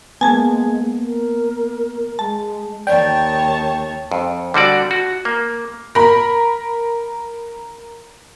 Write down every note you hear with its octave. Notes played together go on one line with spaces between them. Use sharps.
G#3 A#3 B3 G#5 A5 G#6
A#4
G#3 A5
D#2 C#5 D5 G5 A5
F2
D3 G3 F#4 D5
F#4
A#3
A#4 B5